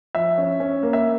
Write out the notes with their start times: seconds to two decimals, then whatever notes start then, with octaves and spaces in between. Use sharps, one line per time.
0.15 F3 E5
0.38 C#4
0.60 C#4
0.83 A#3
0.93 E5